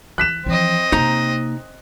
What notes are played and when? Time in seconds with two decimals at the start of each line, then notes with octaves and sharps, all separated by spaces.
0.18 E3 F#6 B6 E7
0.46 E3 F3 C4 D#5
0.92 C3 A#3 D#4 A#5